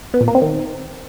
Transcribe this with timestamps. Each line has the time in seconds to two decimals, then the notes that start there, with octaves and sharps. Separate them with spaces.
0.14 B3
0.21 A#2
0.28 A#3
0.35 C4
0.42 D#3